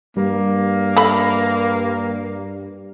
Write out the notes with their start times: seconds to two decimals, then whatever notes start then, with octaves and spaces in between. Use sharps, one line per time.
0.17 G2 G3 A#3
0.97 A3 B5